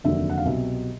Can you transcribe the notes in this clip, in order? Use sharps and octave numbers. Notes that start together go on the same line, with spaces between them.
F1 D#2 D3 F#3 E5
F#5
F5
C2 B2 F#3 E5